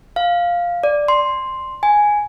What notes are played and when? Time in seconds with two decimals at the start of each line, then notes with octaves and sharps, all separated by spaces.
0.16 F5
0.83 D5
1.08 C6
1.83 G#5